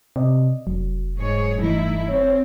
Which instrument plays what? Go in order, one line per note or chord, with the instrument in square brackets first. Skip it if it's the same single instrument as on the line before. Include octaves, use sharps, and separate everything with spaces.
[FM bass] C3 [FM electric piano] D5 D#5
[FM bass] F1 [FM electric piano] F#3
[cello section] G#2 G#4 C#5
[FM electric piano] G2 E3 [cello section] A3 D#4 E4
[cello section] C4 [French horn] C#5